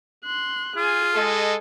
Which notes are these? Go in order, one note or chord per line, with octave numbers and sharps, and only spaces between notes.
C6 F#6
F4 G#4 G#5
G#3 A4 D#5 G#5